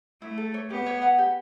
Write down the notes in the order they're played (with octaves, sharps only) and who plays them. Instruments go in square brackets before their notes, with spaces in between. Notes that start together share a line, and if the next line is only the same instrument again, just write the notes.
[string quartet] A3 [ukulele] E4
[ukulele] A4
C#5
[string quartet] B3 [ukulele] G4
[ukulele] C#5
F#5
G4